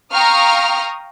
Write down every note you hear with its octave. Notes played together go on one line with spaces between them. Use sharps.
F5 G5 A#5 C#6 D#6 F6